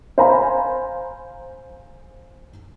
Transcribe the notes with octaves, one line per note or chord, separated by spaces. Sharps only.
C5 F5 G#5 A#5 B5